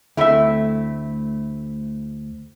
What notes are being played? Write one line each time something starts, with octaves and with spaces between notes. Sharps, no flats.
D2 A3 C4 E4 E5